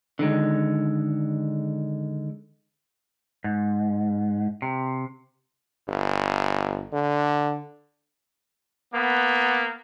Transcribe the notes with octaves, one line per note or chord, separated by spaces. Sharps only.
D3 D#3 G#3
G#2
C3
G1
D3
A#3 B3